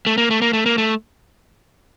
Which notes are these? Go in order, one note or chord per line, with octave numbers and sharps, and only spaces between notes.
A3
A#3
A3
A#3
A3
A#3
A3